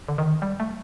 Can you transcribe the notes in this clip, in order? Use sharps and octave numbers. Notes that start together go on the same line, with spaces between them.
D3
D#3
G3
A3